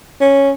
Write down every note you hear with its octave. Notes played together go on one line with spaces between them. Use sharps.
C#4